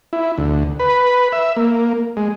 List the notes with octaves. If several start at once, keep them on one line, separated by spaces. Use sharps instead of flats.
E4
D2
B4
E5
A#3
G#3